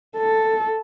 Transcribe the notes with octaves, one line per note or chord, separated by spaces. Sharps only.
A4